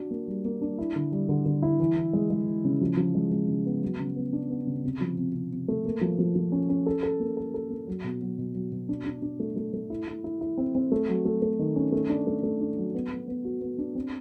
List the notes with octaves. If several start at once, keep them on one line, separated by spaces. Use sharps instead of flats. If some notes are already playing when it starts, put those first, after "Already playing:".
Already playing: D4 F#4
A#3
G3
A#3
D4
E4
D3
G3
D3
D3
E4
E3
E3
G#3
G#3
E3
C#3
F3
F3
G#3
G#3
C#3
B3
F#3
C#3
B3
D4
B3
C#3
C3
F3
C3
C3
C3
A3
A#3
F3
F3
F3
C#4
C#4
A4
A4
A#3
A4
A4
A#3
F#3
B2
F#3
B2
F#3
B2
D4
D4
D4
A3
A3
A3
E4
E4
E4
E4
C4
C4
A3
F#3
A3
A3
D#3
C#4
A3
D4
A3
A3
D4
F#3
B3
B3
B3
F#4
B3
D4
C4